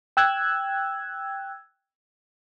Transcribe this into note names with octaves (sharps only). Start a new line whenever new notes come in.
G5 E6 F#6 G#6